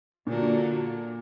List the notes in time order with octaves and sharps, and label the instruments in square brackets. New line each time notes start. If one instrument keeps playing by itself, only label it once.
[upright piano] A#2 [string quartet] D3 F#3 A#3 D4